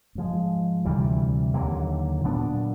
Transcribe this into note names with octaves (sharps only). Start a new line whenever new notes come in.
G#2 F3 G#3
D2 C3 E3 G3
D#2 D3 F#3 A#3
A#2 F#3 B3 D4